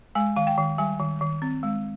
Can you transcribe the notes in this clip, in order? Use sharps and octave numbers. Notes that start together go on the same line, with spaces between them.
G#3 G#5
D#3 F5
G5
D#3
G3 G#5
D#3
D#3
C4
G#3